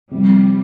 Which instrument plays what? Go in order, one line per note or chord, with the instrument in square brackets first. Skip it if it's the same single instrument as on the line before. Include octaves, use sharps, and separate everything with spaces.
[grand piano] C3 F3 C4 [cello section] G3